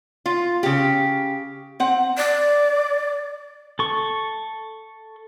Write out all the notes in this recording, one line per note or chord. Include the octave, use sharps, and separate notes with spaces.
F4
C#3 G4
C4 F#5
D5
A4 C#6